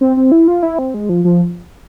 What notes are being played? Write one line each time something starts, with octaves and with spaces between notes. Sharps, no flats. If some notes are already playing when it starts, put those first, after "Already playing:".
C4
C4
E4
F4
E4
C4
G#3
F3
F3